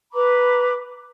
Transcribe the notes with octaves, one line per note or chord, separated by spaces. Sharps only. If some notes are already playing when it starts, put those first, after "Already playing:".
B4 A#5 B5 D6